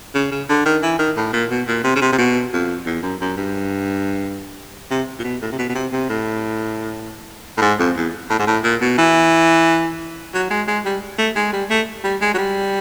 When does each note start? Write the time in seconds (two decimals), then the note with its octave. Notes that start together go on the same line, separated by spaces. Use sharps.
0.14 C#3
0.31 C#3
0.49 D3
0.65 D#3
0.82 E3
0.99 D#3
1.16 A2
1.33 A#2
1.50 B2
1.67 A#2
1.84 C3
1.95 C#3
2.01 C3
2.12 C3
2.18 B2
2.53 F2
2.86 E2
3.03 F#2
3.21 F#2
3.37 G2
4.90 C3
5.19 A#2
5.24 B2
5.42 A2
5.52 C3
5.58 B2
5.69 B2
5.75 C3
5.92 C3
6.09 A2
7.57 A2
7.61 G#2
7.79 F2
7.96 E2
8.30 A2
8.39 G#2
8.47 A2
8.64 A#2
8.81 B2
8.98 E3
10.34 F#3
10.50 G#3
10.67 G#3
10.85 G3
11.18 A3
11.36 G#3
11.52 G3
11.70 A3
12.04 G3
12.21 G#3
12.34 F#3
12.38 G3